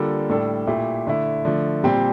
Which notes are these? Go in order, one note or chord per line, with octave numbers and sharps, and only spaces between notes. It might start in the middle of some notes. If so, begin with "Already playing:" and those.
Already playing: D3 G3 A#3 F4 A4
A2 G3 D4 A4
A#2 A3 E4 G4
D3 A3 E4
D3 F3 A3
A#2 G3 C4 G4